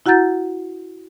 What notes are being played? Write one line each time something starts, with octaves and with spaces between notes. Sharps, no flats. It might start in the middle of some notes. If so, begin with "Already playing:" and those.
E4 F#4 F#5 A#5 G6 A6